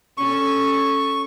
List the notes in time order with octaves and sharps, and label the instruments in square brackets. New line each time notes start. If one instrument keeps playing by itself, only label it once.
[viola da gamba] C#4 A4 [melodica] C#6